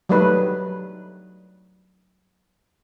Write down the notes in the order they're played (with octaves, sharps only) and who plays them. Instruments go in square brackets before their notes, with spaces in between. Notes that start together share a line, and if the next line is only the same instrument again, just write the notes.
[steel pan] F#3 G3 A3 D#4 B4